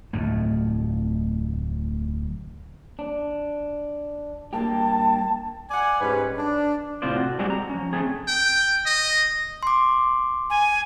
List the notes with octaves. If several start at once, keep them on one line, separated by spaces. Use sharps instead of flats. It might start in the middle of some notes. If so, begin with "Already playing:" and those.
D1 F2 A3
D4
G2 A#3 G4 A5
D5 F#5 G#5
G#2 G3 C#4 B4
D4
A2 C3 C4 F4 C5 D5
F#4
G3 G#3 C4 D4 F#4 G4
A#5
F3 C#4
A3 C4 G#4
G5
D#5
C6 D6
G#5